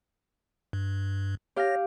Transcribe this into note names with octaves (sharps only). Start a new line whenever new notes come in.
G2
G4 C#5 F5 A#6